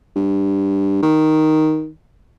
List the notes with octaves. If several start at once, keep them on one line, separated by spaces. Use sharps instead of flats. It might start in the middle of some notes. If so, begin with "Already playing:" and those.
G2
D#3